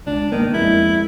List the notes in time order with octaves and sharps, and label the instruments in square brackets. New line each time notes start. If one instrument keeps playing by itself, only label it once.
[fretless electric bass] C#2 [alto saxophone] D4
[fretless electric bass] G2 A#3 B3 [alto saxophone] D#3
[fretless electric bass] F2 G#3 [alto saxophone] E4